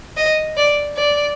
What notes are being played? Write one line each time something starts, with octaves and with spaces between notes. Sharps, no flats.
D#5
D5
D5